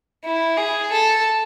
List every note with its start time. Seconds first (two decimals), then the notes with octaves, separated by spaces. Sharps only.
0.24 E4
0.57 G#4
0.92 A4